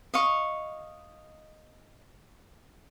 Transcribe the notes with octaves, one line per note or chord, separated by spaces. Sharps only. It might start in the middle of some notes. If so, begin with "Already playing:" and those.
D#5 F5 C#6